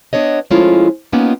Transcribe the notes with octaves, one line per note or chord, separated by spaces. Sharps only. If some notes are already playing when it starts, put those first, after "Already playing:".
B3 D4 C#5 D#5
F3 G#3 A3 C#4 E4 F4
A#3 B3 C#4 D#4 F4 G4